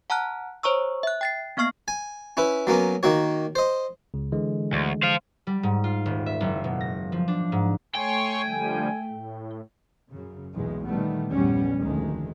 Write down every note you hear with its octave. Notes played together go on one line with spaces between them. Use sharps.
F#5 A5 A#5 F6 F#6
C5 C#5 A#5 C#6 E6
E5 F#6
G5 A6 C7
A#3 B3 F5 C#6 F6 C7
G#5
C#4 E4 B4
F#3 A#3 B3 C#4
D#3 A#3 F#4 C#5
C5 D#5
C#2 C#3
D3 E3 G#3
D2
C5 F5
G3
G#2
F4
D#1
E5
F#1
B2
A#6
F3
D4
G#2
A3 C#5 G5 G#5 C6 C#6
D3 F3 G3
A2
F#2 C#3
B1 E2 A#2 G#3
A#2 D#3 E3 G3 A3 B3
A#1 E2 G2 G3 B3 C#4
F1 D2 D#3 G#3